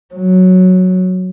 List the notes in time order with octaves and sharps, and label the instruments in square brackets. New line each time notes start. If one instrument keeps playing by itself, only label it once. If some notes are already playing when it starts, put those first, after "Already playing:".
[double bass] F#3